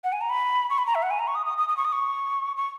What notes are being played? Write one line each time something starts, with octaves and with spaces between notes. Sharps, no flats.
F#5
G#5
A#5
B5
C#6
B5
A#5
E5
F#5
G#5
A#5
C#6
D#6
D#6
D#6
D#6
C#6
D#6
C#6
C#6